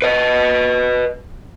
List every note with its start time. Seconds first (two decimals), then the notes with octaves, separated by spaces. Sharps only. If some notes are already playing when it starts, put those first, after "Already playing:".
0.02 B4 D#5